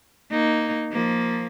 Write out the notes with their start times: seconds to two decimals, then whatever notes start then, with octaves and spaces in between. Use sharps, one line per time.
0.31 A#3 D#4
0.92 F3 A#3